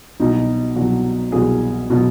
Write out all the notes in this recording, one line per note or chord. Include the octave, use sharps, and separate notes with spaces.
C2 B2 F#3 D#4
C2 B2 F#3 F#4
C2 B2 F#3 G#4
B2 F#3